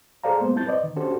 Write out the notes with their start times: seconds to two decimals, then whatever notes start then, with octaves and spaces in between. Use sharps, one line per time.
0.24 G#4 A4 C5 D5 F5 A#5
0.40 G#3 A#3 B3 C5
0.55 G3 C4 E4 A5 G6 A6
0.66 B4 C5 D5 D#5
0.84 D#3
0.96 C#4 D4 F#4 G4 A4 C5